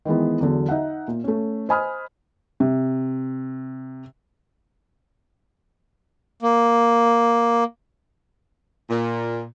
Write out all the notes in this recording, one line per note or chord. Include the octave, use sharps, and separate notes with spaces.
D#3 E3 G#3 B3
E2 D3 F#3
D#4 E5 F#5
A#2
A3 C#4
C5 D#5 G#5 B5 D#6 F6
C3
A#3
A#2